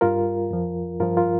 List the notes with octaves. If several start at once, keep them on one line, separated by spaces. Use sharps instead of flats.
G2 G3 F4 A#4
F2 F3
G2 F3 F4 A#4
F4 A#4